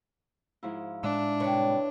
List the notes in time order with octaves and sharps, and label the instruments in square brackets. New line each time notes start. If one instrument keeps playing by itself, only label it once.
[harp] G#2 F3 E4
[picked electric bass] A2 G#3 [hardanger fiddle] D4 [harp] E5 F#6
[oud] C3 G3 [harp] B4 C#5